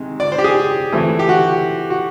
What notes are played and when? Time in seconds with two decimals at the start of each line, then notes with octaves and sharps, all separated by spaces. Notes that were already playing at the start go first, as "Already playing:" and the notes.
Already playing: C3 D#3 G#3
0.20 D5
0.32 C5
0.38 G4
0.44 G#4
0.92 E3 A3 C4 E4
1.19 G4
1.29 F#4
1.90 F#4